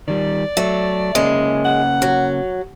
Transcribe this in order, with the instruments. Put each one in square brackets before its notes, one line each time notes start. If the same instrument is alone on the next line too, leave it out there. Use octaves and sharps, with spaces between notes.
[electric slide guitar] D#3 G3 [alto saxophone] D5
[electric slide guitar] F#3 [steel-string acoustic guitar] A3
[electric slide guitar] C#3 A#3 C#4 [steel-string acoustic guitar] G#3
[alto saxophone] F#5
[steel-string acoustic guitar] F#3